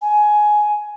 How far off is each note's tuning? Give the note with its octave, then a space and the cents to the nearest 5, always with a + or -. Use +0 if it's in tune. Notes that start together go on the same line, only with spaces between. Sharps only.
G#5 +15